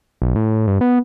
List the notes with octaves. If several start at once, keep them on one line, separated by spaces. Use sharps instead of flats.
B1
A2
G2
B3